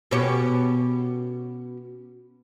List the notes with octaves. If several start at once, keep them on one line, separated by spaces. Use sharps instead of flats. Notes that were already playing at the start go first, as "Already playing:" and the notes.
B2 C#4 G4